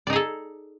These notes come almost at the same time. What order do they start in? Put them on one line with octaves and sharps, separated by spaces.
D5 D#4 G#4 A4